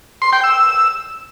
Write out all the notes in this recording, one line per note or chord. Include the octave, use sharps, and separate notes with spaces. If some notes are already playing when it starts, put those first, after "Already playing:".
C6
G5
E6